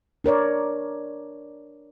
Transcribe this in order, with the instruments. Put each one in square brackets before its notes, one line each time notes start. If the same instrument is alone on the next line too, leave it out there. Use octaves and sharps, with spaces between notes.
[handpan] D4 A#4 C#5 D5